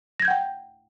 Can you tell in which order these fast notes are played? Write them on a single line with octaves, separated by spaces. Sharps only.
A#6 G#6 G6 F#5 G5